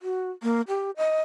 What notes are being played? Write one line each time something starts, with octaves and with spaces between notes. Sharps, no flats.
F#4
A#3
G4
D#5